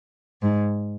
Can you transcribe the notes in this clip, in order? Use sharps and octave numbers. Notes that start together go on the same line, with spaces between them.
G#2